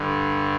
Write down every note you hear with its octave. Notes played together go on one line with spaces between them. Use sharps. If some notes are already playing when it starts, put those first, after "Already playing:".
Already playing: G2 D3